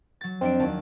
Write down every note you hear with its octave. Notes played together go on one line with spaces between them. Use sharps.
F#3 A6
F2 C4 D4 D7
D#2 F#3 A5